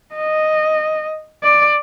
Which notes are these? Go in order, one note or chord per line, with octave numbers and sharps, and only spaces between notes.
D#5
D5